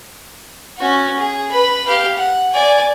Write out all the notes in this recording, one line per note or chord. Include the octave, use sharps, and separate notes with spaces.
C#4 F#4
G#4
B4 B5
G4 F5
F#5
D5 G#5